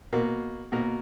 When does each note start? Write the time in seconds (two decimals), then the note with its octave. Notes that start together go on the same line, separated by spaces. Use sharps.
0.13 B2 A#3
0.72 B2 A#3 A#4